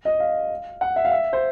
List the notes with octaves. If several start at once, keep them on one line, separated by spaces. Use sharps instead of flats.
D#5
F5
F#5
E5
F5
E5
C5